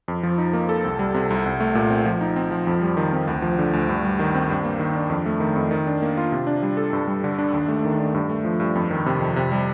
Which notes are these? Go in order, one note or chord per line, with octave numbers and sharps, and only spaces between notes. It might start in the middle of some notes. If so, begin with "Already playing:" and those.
F2
F3
D#4
A#3
A4
C2
G3
C3
C2
C2
A3
A#2
C4
F3
D#4
C4
F3
F2
G3
D#3
C4
D2
F3
D3
D2
G2
G3
D#3
C4
G2
A#3
D#3
D4
F2
A3
D#3
F2
D#3
D4
A#3
F4
C3
D4
G3
A4
G2
G3
D3
D4
D#2
A3
D#3
D4
G2
A3
F3
G2
F2
D#3
C3
F2
C3
G3